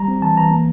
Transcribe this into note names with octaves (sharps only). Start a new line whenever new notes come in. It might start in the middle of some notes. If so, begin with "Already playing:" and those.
Already playing: G3 A#5
C4
E3 A5
E3 A#5
A#3